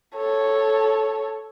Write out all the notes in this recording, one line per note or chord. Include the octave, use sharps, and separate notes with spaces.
A4 C#5